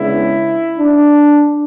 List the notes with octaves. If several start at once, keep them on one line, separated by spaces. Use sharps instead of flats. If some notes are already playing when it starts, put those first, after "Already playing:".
Already playing: C#3 G#3 B3 D4 E4
D4